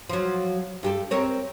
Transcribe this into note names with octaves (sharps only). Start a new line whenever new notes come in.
F3 F#3
G2 G4 A4
C4 A#4 C#5